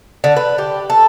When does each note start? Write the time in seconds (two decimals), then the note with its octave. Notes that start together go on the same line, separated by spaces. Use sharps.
0.24 D3
0.36 B4
0.58 G4
0.90 A4